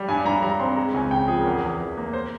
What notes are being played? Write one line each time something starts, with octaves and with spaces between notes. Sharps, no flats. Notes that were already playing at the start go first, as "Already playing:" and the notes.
Already playing: G3
G2 G#5
G2 A#5
G3 A#5
C4 C6
G#3 A#5
C#2 G#5
C#3 G5
F3 G#4
E2 A#4
G#4
E2
E3
A#3
C5